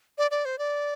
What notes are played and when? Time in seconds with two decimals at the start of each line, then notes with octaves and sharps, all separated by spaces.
0.18 D5
0.31 D5
0.45 C5
0.59 D5